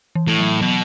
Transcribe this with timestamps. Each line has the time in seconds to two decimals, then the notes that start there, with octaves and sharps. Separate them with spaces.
0.15 E3
0.27 A2
0.38 F#3
0.61 B2 F#3